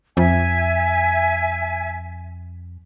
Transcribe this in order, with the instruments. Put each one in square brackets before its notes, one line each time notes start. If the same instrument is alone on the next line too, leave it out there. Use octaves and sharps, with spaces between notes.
[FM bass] F2 [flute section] E5 G#5